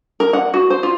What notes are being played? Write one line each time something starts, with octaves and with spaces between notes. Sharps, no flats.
A#4
F#5
F#4
C5
F4